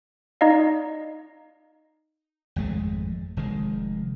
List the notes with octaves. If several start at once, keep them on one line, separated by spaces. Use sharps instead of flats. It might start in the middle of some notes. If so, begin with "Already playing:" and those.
D#4 D5 D#5 F5
G#1 F2 G#3 A3
F1 D#3 G#3